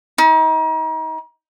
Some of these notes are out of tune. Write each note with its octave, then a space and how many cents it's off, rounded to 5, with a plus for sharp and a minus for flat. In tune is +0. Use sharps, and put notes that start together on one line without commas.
D#4 +35